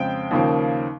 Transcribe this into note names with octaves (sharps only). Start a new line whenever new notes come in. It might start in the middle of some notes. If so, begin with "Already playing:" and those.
Already playing: F2 C#3 G#3 C4 G5
D#2 C#3 F3 A#3